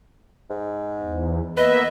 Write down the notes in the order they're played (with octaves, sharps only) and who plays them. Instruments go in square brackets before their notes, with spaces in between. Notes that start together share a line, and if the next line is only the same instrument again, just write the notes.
[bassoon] G#2
[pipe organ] E2
[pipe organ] A#3 B3 E5 [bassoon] B4 [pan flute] D#5